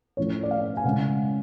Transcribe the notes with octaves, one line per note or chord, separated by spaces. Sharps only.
A2 F3 A3 C#4 C#5
D5
F5
G#5
C#3 G#3 C#4 F#5